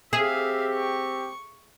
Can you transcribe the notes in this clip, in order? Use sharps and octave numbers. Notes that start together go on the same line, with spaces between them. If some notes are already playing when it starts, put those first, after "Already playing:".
C4 G4 G#4 E5 F5
C#6